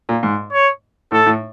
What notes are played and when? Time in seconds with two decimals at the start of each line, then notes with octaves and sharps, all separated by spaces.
0.09 A#2
0.23 G#2
0.53 C#5
1.12 A2 A4
1.26 A2